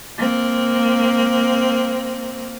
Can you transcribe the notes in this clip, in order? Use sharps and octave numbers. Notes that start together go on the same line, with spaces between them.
A#3 C4